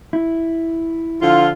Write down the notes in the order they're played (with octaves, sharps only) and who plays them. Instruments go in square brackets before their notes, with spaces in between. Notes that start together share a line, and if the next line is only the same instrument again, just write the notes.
[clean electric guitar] E4
[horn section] D3 F3 F4